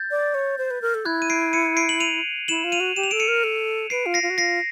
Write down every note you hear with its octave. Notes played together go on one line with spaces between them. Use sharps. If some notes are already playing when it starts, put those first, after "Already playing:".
Already playing: G6 A6
D5
C#5
C5
B4
A#4
A4
E4 F#6 G#6
D#7
C7 D7
C#7 D#7
C7 D7
F#7
D#7 F7
E4 E7 F#7
F4
D#7 F7
F#4
G4 E7
F7
A4 D7 E7
C#7 D#7
A#4
A4
B4 C7 D7
F4
A#6 C7
F4
F#4
F4 A#6 C7